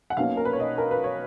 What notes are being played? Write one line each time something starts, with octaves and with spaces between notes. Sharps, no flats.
F#5
B1 B2 A#3 C#4 F5
A#4
B4
C#5
D#5
A#4
B4
C#5